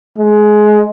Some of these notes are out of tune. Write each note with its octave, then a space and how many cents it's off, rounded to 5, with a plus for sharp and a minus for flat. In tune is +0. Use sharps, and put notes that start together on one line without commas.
G#3 +20